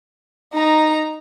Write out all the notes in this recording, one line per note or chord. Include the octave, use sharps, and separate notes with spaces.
D#4 A#5